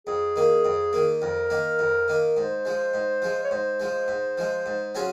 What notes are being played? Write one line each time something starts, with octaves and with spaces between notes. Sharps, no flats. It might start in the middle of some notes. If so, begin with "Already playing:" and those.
F2 G#4
D#3 A#3
F2
D#3 A#3
F2 A#4
D#3 A#3
F2
D#3 A#3
G#2 C5
F3 G#3
G#2
F3 G#3
C#5
G#2 C5
F3 G#3
G#2
F3 G#3
G#2
F#3 C#4 F4 G#4